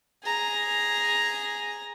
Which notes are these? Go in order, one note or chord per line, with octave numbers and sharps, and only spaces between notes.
G#4 A#5